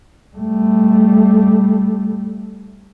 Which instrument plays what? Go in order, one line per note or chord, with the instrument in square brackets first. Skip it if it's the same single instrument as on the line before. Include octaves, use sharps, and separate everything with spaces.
[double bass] G3 A3